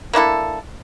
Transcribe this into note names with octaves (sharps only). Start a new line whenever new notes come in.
A#3 D4 E4 A4